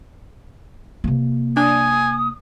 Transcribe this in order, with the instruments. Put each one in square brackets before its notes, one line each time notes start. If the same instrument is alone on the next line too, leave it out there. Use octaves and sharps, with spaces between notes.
[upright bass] C3 A#3
[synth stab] D4 [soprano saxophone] G#5 [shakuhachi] D#6